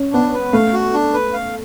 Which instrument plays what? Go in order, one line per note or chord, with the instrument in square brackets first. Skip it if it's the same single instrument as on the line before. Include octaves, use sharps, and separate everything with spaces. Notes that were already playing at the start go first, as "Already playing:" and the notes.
Already playing: [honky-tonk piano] C#4
[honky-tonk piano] B3 [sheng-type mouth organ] D4
[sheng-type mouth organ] B4
[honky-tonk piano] A3 [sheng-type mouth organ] F5
[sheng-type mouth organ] F#4
D4
B4
F5